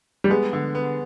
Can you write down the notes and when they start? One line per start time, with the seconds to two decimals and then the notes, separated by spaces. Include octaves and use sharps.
0.24 G3
0.30 G#3 B3
0.53 D3
0.75 B3